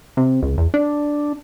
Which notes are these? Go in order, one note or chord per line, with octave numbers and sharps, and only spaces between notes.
C3
C#2
E2
D4